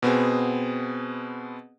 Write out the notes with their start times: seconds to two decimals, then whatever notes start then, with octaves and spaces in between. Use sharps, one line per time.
0.02 B2 B3 C4 G#4